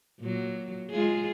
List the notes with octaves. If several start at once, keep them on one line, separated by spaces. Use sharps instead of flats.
A#2 F#3
G#3 F4 G#4